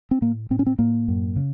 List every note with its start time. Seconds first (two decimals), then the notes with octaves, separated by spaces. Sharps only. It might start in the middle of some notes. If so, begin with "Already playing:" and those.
0.11 C4
0.22 A2 A#3
0.50 A2 C4
0.59 C#4
0.66 C4
0.79 A2 A#3
1.08 F#2
1.36 C#3